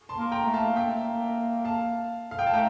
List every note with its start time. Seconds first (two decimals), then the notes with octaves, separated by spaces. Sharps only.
0.09 A5 C6
0.17 A#3
0.32 G5 A#5
0.46 A3
0.54 F5 A5
0.75 A#3 E5 G5
1.65 F5 A5
2.31 F5
2.39 G5
2.47 A5
2.53 A3 G5 A#5